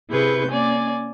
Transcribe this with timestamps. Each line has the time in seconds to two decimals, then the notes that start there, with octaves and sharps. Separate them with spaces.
0.11 C3 E4 G#4 B4 C#6 G6
0.49 A#3 C#4 D5 G#5